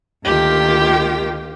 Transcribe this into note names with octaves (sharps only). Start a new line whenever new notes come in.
D2 D#3 A#3 F4 G4 G5